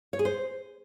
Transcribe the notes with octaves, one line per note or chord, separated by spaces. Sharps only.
C#5
G#4
C5